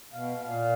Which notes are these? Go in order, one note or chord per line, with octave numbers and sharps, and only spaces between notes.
B2 F5
B2
A#2 F5